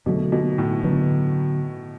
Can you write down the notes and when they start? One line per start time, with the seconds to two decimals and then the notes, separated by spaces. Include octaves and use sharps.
0.06 B2 D3 F#3 A3
0.32 B2
0.58 A2
0.84 D3 F#3 B3